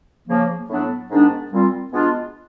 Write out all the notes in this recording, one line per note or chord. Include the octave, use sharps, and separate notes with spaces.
C#3 F3 A#3
A2 F#3 B3 D4
G#2 D#3 G#3 B3 D4
A#2 G3 C4 F4
B2 G#3 B3 D4 F4